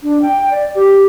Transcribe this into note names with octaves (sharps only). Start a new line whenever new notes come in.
D4
G5
D5
G4